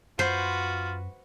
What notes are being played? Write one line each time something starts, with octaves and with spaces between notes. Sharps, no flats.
F#2 F4 F#4 B4 C5